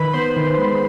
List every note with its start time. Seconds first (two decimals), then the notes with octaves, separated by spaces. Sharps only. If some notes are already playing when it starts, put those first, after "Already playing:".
Already playing: D#3 B4 B5
0.13 B3 C5 C6
0.36 D#3
0.58 G#3